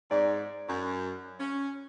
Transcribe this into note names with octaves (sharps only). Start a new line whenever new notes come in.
G#2 D5
F#2
C#4